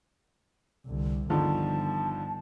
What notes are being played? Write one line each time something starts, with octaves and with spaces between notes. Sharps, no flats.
C2 D3
G1 D3 D#3 F3 A5